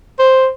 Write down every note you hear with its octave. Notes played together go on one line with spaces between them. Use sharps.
C5